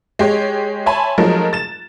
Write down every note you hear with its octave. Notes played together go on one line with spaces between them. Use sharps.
G#3 G4 C#5
C#5 E5 G#5 A5 B5 C6
F3 F#3 G#3 A3 D#4 A#4
A6 E7